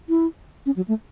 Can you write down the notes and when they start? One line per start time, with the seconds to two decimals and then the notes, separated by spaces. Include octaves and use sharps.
0.09 E4
0.66 C#4
0.76 F#3
0.88 A3